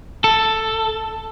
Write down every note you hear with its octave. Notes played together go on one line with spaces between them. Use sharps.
A4